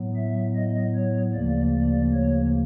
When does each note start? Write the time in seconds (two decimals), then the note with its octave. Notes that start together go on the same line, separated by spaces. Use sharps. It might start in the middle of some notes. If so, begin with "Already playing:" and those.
Already playing: A2 F#3 B3
0.16 E5
0.55 D#5
0.95 C#5
1.34 D2 C#3 F3 A#3 D5
1.74 D5
2.13 C#5